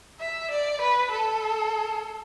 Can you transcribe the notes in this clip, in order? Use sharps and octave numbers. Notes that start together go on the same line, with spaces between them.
E5
D5
B4
A4